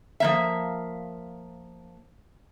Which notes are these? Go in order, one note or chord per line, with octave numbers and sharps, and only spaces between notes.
F3 A#3 E5